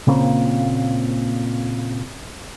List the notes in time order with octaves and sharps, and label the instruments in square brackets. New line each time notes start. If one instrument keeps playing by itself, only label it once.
[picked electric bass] A#2 C#3 A#3 C4